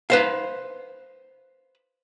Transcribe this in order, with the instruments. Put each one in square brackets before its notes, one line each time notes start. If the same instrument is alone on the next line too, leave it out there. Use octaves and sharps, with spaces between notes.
[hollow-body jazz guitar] B4 C5 F5